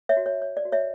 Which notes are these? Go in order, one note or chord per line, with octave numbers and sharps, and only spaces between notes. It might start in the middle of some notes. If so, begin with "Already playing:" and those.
C#5 E5
F#4
C#5
C#5
D5
F#4
C#5 E5